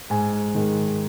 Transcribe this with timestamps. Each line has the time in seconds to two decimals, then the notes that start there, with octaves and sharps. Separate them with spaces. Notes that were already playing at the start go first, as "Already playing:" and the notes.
0.10 G#2 G#5
0.55 D#3 G#3